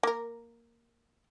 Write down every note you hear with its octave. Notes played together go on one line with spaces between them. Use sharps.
A#3 A#4